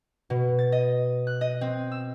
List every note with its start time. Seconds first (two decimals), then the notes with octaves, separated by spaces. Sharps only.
0.30 B2
0.59 A6
0.72 D#5
1.27 F#6
1.41 D#5
1.61 C4
1.92 E6